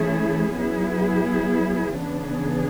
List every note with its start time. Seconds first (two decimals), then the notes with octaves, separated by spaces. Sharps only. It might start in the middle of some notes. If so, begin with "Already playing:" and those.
Already playing: E3 A3 C#4 E4 G#4
0.57 F#3 B3 E4 G#4
1.97 C#3 E3 B3 D4 G#4